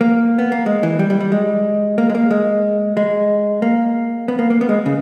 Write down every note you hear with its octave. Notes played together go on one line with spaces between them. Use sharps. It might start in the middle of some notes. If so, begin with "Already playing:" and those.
A#3
B3
A#3
G#3
E3
G3
G3
G3
G#3
A#3
G#3
A#3
G#3
G#3
A#3
B3
A#3
A#3
B3
G#3
C#3